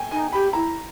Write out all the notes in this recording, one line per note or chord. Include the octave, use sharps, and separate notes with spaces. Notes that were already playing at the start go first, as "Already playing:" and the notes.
Already playing: G5 G#5
D#4 G#5
G4 B5
E4 A#5